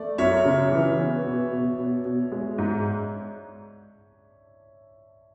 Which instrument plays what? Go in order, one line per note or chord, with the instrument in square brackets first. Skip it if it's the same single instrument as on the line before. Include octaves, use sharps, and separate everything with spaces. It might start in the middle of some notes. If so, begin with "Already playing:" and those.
Already playing: [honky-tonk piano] A3 [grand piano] D5
[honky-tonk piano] F#2 [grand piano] C#5 E5
[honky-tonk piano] C#3
E3
B3
B2
B2
B2
B2
G#3
G#2